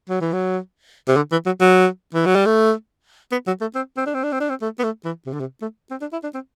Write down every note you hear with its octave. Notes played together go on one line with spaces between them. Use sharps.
F#3
E3
F#3
C3
D3
E3
F#3
F#3
E3
F#3
G3
A3
B3
F#3
A3
C4
C4
D4
C4
D4
C4
D4
C4
A3
B3
A3
E3
C3
D3
C3
A3
C4
D4
E4
D4
C4